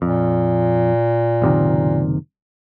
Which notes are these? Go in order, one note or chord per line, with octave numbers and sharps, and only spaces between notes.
F2 A#2
F#1 C3 D#3